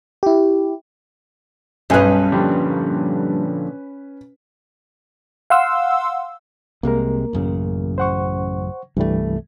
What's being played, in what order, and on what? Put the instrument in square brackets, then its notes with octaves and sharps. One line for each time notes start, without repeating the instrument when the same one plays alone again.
[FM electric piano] E4 G4
[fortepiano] B1 G#5 F#6 [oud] G2 D#4 [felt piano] C#4 B4
[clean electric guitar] A#2 D3 F3 [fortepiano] G3
[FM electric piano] F5 F#5 C6 E6
[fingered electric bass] C2 C3 G#3 [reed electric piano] A#3 A#4
[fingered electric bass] A1 F#2 C#3
[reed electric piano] C5 F#5 C#6
[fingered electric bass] C2 A3 [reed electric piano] G2 E3 G3